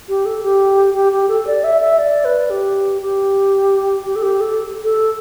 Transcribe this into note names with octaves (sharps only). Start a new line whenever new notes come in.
G4
A4
G4
G4
G4
A4
D5
E5
E5
D5
B4
G4
G4
G4
A4
G4
A4
A4